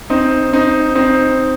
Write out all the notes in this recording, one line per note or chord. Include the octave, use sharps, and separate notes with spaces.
C4 D#4
C4 D#4
C4 D#4